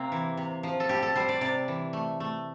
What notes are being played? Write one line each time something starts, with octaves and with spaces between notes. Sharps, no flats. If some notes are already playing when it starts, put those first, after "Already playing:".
Already playing: C3 A#3 C4
E3
C3
F3
A4
G3 G4
A4
G3 C5
D5
C3 D5
E3
A3
A3